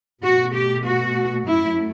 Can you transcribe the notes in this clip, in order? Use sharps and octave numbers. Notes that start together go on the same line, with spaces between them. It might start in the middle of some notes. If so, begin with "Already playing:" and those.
B2 A3 F#4
G4
F#4
F#2 F#3 A3 E4